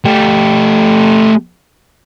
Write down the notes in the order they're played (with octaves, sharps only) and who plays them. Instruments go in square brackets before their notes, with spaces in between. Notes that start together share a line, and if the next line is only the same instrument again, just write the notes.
[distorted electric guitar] A3 G4